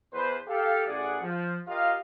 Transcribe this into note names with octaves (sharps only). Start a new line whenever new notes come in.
E2 B4 C5
G4 A4 F5
A1 G#4 D5 F#5
F3
F4 G4 A#4 D#5 F5